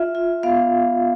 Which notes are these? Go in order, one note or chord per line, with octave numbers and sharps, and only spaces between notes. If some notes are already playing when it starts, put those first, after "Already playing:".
Already playing: F4 E5
F4
B3 F5